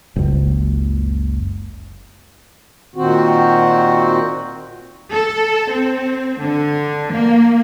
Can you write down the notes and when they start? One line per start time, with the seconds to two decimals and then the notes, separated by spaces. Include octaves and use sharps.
0.16 F#1 C#2
2.96 A#2 D#3 C4 F#4
5.12 A4
5.71 C4
6.41 D3
7.12 A#3